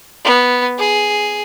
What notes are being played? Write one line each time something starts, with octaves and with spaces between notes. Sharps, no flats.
B3
G#4